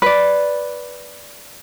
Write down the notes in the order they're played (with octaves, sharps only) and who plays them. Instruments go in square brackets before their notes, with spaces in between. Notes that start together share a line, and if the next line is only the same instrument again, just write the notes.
[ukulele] B4 D5